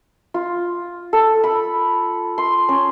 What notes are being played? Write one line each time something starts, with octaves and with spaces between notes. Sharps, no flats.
F4
A4
B5
C6
C#4